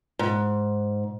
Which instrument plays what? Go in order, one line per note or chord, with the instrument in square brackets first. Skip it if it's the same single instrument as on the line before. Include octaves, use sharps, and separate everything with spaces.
[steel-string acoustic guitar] G#2